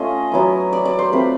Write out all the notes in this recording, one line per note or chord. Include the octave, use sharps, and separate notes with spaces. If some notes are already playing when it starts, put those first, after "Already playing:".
Already playing: A3 C#4 F4 D#5
F#3 B3 E4
D5
D5
C5
A3 C4 F4 B4